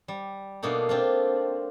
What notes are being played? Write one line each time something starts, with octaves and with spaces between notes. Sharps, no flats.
G3
B2 A3 A#3 D4 D#4
C4 D4 F4